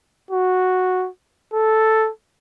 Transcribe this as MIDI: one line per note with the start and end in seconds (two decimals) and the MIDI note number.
0.30 1.08 66
1.53 2.10 69